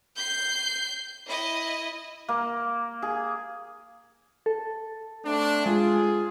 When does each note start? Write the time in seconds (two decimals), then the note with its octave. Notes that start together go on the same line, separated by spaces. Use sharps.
0.16 G6 C7
1.27 E4 D#5
2.29 A#3
3.02 G#4
4.46 A4
5.25 A3 C4 D4
5.66 G#3 F4 G#4